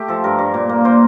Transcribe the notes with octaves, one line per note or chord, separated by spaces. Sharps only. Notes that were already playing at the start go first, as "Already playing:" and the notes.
Already playing: A3 G4
F3 A4
G2 A#4
G2
A#2
A#3
A#2 C5